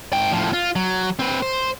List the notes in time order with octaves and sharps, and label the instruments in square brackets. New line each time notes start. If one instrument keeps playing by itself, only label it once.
[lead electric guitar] G#2 G5
A2 F3
F4
F#3
C4 B4
C5